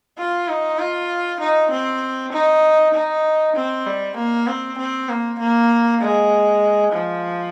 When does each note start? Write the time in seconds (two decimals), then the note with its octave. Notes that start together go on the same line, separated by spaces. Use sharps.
0.18 F4
0.49 D#4
0.79 F4
1.40 D#4
1.71 C4
2.32 D#4
2.94 D#4
3.56 C4
3.87 G3
4.17 A#3
4.48 C4
4.78 C4
5.09 A#3
5.39 A#3
6.01 G#3
6.92 F3